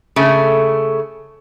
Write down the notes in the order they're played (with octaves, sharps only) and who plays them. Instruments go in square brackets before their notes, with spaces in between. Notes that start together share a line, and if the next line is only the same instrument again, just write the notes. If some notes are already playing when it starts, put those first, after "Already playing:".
[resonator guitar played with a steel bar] C#3 A3